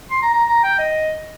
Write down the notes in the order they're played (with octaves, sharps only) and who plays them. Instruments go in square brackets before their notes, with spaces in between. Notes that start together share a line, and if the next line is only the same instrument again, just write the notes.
[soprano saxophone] C6
A#5
A#5
A#5
G5
D#5